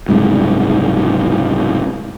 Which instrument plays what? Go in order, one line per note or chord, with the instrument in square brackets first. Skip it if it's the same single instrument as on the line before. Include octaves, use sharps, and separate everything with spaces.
[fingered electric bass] F#1 C2 G#2